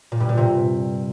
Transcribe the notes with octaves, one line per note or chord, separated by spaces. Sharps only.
A#2
G2
A#2
C3